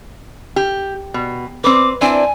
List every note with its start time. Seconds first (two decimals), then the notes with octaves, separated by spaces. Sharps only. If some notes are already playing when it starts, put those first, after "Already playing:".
0.56 G4
1.14 B2
1.64 C4 B4 D6
2.01 C4 D4 E4 G#5